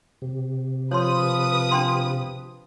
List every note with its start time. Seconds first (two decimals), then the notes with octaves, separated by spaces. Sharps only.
0.22 C3
0.91 F3 B4 C#5 C6 D#6
1.71 D4 G5 C6